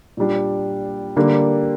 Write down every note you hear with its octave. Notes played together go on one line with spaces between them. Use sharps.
A#2 G3 D4
D3 G3 A#3 D4